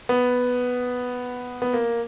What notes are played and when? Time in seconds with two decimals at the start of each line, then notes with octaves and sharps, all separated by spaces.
0.09 B3
1.62 B3
1.73 A#3